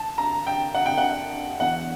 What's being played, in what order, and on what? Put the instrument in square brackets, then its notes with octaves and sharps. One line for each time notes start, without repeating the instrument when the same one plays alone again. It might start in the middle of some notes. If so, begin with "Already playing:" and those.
Already playing: [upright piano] A5
A#5
G5
F#5
G5
F#5
[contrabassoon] E2 [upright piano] F#5